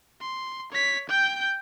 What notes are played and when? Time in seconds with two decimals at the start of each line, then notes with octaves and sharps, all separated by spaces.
0.21 C6
0.72 C#5 B6
1.10 G5 G6